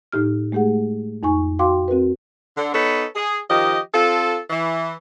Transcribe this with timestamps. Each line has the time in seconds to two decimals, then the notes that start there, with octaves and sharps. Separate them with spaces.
0.12 A2 D#4 G4 F6
0.52 G#3 A3 G4 G#4 F#5
1.23 F2 D#4 G#5 C#6
1.59 F#4 F5 G5 C6 D6
1.88 C4 F#4 A#4 B4
2.57 D3
2.73 B3 D#4 A4 B4 C#5
3.15 G#4
3.49 D#3 F3 G4 D#5
3.93 C4 F4 A4
4.50 E3